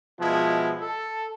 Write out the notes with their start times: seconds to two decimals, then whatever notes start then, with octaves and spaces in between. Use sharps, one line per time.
0.20 B2 F3 G#3 E4
0.81 A4